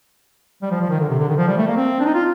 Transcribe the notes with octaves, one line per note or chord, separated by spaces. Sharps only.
G3
F3
F3
D#3
D3
C3
D3
D#3
F3
G3
A3
A#3
C4
D4
D#4
F4